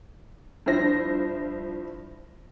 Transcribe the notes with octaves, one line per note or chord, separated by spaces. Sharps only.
G2 F3 E4 C5 A#6